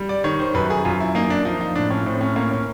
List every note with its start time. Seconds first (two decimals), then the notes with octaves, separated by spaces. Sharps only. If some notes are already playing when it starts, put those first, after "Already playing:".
Already playing: G3
0.09 D5
0.24 D#3 C#5
0.40 C5
0.54 F#2 B4
0.70 G#4
0.85 F#2 F4
1.00 E4
1.15 A#3 D#4
1.30 D4
1.45 F3 D#4
1.61 D#4
1.76 A2 D4
1.90 C#4
2.06 A2 C4
2.21 C#4
2.36 A#3 C#4
2.51 C#4